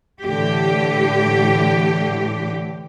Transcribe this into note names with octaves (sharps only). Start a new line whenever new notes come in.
A2 D3 E3 G4